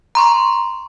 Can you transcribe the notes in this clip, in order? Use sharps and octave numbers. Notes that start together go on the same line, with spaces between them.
A#5 C6 C#6